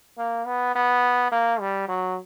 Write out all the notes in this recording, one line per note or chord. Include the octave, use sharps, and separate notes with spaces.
A#3
B3
B3
A#3
G3
F#3